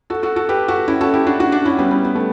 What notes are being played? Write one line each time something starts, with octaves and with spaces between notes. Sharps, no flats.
F#4 A4
F#4 A4
F#4 A4
G4 B4
F#4 A4
C#4 E4
F#4 A4
E4 G4
D4 F#4
D4 F#4
D4 F#4
C#4 E4
G3 B3
G3 B3
B3
A3